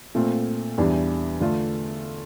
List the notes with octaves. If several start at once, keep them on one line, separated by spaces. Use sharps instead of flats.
A#2 A3 C4 F4
E2 E3 G3 D4
D3 A3 D4 F4